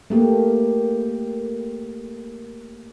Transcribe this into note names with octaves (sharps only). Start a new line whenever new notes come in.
A3 A#3 G4